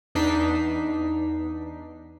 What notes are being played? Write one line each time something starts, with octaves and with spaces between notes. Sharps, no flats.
E2 D4 D#4 B6 C7